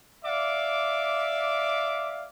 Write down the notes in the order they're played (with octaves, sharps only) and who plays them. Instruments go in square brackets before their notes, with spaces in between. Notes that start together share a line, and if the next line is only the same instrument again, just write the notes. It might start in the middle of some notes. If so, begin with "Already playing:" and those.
[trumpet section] D5 E5 F5 D6